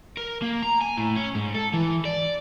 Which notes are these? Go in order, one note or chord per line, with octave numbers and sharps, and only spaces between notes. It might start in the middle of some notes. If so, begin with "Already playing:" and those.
A#4
A#3
A#5
G#5
A2
C#4
G#2
A4
E3
D5